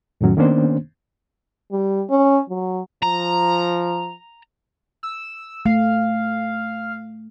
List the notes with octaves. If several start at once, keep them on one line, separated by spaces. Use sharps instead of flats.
F2 A2 D#3 F#3 C#4
D#3 A#3 B3 C#4 D4 C5
G3
C#4
F#3
F3 A#5
E6
A3 F5